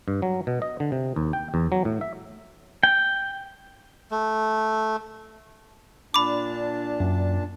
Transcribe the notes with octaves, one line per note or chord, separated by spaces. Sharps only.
G2
F#3
B2
D#5
D3
C3
D#2
G5
E2
F#3
A2
E5
G5
A3
A#2 D4 A5 B5 D6
F#2